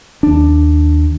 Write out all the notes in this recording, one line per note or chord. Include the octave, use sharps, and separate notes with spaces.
D#2 D4